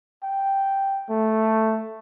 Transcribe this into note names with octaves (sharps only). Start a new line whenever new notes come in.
G5
A3